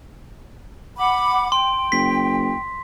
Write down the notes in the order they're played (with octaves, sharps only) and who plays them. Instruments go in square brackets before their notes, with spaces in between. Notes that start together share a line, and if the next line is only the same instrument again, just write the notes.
[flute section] F#5 B5 D6
[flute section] G5 [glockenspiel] C6
[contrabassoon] F#1 [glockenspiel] B6